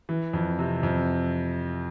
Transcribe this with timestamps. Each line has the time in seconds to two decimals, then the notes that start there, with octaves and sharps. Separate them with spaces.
0.09 E3
0.33 F2
0.59 C3
0.83 F2